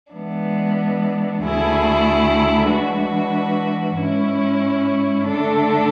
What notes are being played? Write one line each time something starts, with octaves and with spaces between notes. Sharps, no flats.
E3 G#3 B3 D4
D2 D3 A3 E4 G#4
E3 G#3 D4 F#4 B4
G#2 G#3 C#4 E4
D3 A3 D4 A4